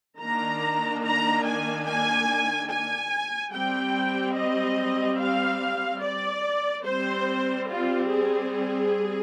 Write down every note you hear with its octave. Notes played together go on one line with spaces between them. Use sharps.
D#3 A#3 D4 A#5
A#5
G#5
G#5
G#5
G3 C4 G5
D#5
F5
D5
G3 C4 C5
F4
G#4